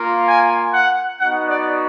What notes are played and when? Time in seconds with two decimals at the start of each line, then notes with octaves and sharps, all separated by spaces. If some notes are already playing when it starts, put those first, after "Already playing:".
Already playing: A#3 F4
0.28 G#5
0.74 F#5
1.19 B3 D#4 F#4 F#5
1.49 D5